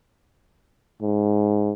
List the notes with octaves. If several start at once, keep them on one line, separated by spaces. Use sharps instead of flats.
G#2